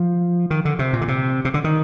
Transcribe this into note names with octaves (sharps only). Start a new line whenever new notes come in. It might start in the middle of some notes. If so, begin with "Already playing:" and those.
Already playing: F3
D#3
D3
C3
A#2
D3
C3
C3
D3
D#3